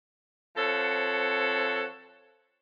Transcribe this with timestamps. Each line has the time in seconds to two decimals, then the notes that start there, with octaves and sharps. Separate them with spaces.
0.57 F3 C4 A4 C#5 F#5